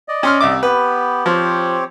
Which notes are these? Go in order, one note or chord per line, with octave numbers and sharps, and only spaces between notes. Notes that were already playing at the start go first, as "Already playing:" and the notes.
D5 D#5
C#4 C6 F6
C2 E5 D6
B3 G4 B4
F3 C4 G4 C#5